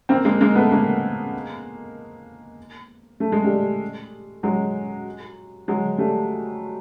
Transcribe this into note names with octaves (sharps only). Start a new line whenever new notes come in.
A#3 C4
G#3 A#3
G#3 A#3
A3 B3
G#3 A#3
A3
G#3
G3 A3
F#3 G#3
F#3 G#3
G3 A3